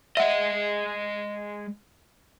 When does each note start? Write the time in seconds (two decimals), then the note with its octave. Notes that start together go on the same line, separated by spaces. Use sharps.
0.17 G#3 D#5 E5 F#5